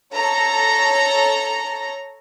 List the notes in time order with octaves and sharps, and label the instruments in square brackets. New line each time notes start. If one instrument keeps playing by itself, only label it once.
[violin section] A4 C#5 A#5